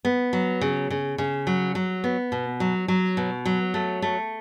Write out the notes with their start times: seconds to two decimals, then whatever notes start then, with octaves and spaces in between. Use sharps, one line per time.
0.05 B3
0.33 F#3
0.61 C#3
0.90 C#3
1.18 C#3
1.47 F#3
1.75 F#3
2.04 B3
2.32 B2
2.60 F#3
2.88 F#3
3.17 B2
3.45 F#3
3.74 A3
4.02 A3